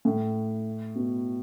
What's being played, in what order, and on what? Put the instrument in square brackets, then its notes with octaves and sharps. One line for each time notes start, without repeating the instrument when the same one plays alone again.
[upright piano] A2
B2